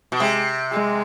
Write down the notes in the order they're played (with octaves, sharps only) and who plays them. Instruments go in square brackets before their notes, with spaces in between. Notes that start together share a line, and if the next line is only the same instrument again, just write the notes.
[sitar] B2
[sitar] C3 [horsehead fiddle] G#3
[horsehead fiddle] G#3